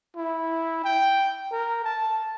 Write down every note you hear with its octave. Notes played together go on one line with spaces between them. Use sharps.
E4
G5
A#4
A5